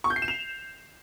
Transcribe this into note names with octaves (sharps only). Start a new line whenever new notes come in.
C#6
G6
C7
E7
F7